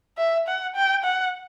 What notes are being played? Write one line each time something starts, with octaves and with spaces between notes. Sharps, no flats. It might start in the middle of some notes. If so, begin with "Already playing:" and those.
E5
F#5
G5
F#5